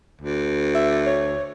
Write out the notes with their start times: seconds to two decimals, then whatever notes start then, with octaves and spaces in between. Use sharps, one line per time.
0.22 D2
0.75 E5
1.06 C#5